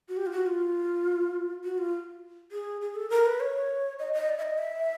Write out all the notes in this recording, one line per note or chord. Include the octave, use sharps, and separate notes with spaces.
F#4
G4
F4
F#4
F4
F#4
F4
G#4
G#4
A4
A#4
B4
C#5
D#5
D#5
D5
E5
D#5
E5